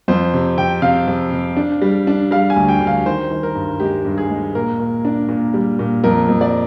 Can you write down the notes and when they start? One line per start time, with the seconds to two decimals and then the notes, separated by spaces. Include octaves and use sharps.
0.08 F2 C5
0.34 C3
0.58 C3 G5
0.82 C3 F5
1.07 F2
1.32 C3
1.57 D4
1.82 G3
2.07 D4
2.31 G3 F5
2.50 G#5
2.56 D2
2.69 G5
2.80 D2
2.87 F5
3.05 D#3 C5
3.31 D#3
3.43 A#4
3.55 G2
3.80 G#3 G4
4.05 G2
4.18 G#4
4.30 G#3
4.55 A#2 A#4
4.79 A#2
5.05 D4
5.29 A#2
5.54 G3
5.79 A#2
6.04 F2 A#4
6.28 F2
6.41 D5